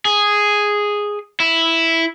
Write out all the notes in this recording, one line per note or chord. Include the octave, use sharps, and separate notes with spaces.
G#4
E4